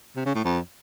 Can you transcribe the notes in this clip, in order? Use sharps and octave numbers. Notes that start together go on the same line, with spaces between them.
C3
C#3
A2
F2